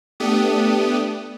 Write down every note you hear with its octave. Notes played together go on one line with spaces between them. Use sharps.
A3 B3 D4 G4 D#6